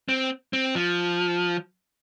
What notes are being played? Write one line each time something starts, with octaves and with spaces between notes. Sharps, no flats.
C4
C4
F3